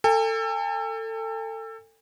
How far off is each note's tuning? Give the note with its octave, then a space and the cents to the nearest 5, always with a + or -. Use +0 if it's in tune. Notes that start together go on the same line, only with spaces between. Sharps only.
A4 +25 G#5 -45